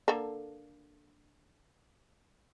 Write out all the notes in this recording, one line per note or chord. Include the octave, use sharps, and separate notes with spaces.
D3 A#3 A4